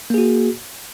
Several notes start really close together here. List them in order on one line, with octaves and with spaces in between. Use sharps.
A#3 G#4 F#4